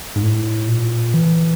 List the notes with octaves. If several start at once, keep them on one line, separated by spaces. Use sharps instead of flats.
G#2
A2
A#2
E3